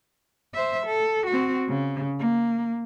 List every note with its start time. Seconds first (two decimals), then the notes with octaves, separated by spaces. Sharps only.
0.54 C5 E5
0.86 A4
1.27 C4 F#4
1.68 C#3
2.19 A#3